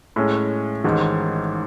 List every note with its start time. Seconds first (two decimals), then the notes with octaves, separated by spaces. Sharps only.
0.16 A2 G#3 C#4
0.84 A1 G#2 D#3